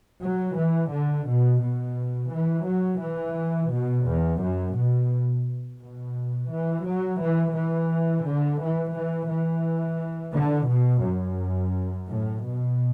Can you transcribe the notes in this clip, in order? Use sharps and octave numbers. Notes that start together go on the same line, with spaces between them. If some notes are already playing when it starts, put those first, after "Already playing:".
F#3
E3
D3
B2
B2
E3
F#3
E3
B2
E2
F#2
B2
B2
E3
F#3
E3
E3
D3
E3
E3
E3
D3
B2
F#2
A2
B2